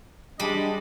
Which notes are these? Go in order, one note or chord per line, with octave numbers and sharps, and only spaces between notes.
G3 G#3 D4 D#5 B5